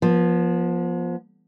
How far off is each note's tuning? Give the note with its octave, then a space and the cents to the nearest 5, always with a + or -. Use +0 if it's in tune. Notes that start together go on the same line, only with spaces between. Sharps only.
F3 +0 B3 -40